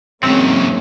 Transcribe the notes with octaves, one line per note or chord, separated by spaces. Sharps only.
E2 G#2 C#3 F#3 A#3 C4 C#4